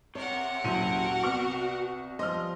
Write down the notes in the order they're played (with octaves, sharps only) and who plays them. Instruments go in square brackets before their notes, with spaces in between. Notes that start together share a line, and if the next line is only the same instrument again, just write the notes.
[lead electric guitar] C3 [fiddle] A#4 F#5 [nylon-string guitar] C#5
[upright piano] D#1 C6 D#7 [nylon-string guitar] F#3 C#4 E4 [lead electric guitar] F#4
[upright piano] C2 C#6 F6 [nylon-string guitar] B3
[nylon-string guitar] F3 G3 C5 [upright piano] D#5 D#6 F6